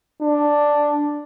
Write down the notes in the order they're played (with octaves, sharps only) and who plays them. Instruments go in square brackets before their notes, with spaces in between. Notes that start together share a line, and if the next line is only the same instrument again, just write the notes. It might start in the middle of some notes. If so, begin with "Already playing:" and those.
[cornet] D4